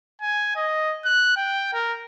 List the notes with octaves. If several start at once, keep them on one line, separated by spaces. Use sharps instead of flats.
G#5
D#5
F#6
G5
A#4